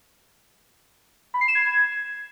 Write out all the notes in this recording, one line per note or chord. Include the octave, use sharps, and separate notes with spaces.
B5
C7
E7
G#6